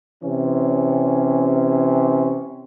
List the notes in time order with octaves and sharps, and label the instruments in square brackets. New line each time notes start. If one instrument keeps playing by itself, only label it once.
[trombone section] C3 E3 C#4